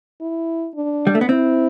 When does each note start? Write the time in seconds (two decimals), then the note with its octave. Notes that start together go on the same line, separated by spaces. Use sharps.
0.21 E4
0.75 D4
1.07 G3
1.15 A3
1.21 B3
1.29 C4 E4